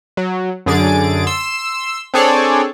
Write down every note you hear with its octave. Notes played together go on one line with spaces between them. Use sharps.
F#3
F#2 D3 G#4 A6 D7
C6 E6
C4 D4 G#4 A4 C#5 D5